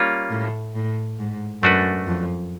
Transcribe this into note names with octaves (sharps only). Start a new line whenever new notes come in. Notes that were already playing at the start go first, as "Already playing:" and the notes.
Already playing: G3 A#3 C#4 F4
A2
A2
G#2
F#2 A3 D4 F#4 B4
F2